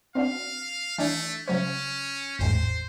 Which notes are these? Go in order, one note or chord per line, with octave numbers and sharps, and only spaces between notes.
C4 D4 F#4 F5
E3 A3 D4 G#6
C#3 F#3 C#4 C5
G#1 E2 A2 C5